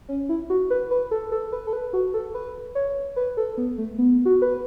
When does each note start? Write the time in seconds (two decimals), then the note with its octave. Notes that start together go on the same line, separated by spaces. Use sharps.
0.09 C#4
0.29 E4
0.50 F#4
0.70 B4
0.91 B4
1.11 A4
1.32 A4
1.52 B4
1.67 A4
1.73 B4
1.93 F#4
2.14 A4
2.34 B4
2.75 C#5
3.16 B4
3.37 A4
3.58 B3
3.78 A3
3.98 B3
4.25 F#4
4.42 B4